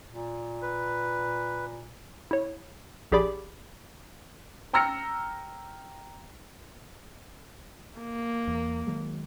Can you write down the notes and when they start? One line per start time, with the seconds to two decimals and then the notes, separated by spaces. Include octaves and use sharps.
0.11 A#2
0.62 B4
2.31 E4 C#5
3.12 A#1 G4 G#4 D5 B5 D6
4.73 G5 A#5 E6 F6 A#6 C#7
7.99 A#3
8.48 E2
8.87 D#3 F#3 G#3